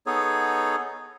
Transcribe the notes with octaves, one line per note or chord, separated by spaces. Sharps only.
B3 D#4 G#4 A4 C#5